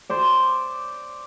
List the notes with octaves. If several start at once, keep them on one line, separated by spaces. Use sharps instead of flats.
C5 D5